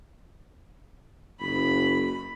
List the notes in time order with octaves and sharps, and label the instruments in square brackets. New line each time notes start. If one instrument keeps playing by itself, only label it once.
[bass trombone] F#1 [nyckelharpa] B5